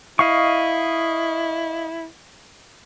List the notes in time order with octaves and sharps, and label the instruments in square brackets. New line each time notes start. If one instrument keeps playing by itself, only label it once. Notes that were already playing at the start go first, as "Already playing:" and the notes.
[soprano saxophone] E4 [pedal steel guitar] D#5 F5 C#6